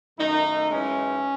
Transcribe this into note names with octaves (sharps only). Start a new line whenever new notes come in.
F#2 D#3 A3 D#4
F#2 E3 G#3 C#4